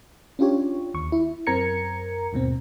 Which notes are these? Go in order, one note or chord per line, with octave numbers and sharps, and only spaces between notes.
C#4 D4 F4 G4 C#5
D#2 C#6
E4
F#2 C4 A#4 A#5 G#6 C#7
D#2 G#2 B2 C4